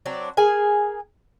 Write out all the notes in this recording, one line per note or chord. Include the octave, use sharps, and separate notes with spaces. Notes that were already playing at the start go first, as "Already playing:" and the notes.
F#3 C4 D4
G#4 A#4 G#5